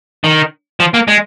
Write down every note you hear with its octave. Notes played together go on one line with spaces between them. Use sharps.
D#3
F3
A#3
G#3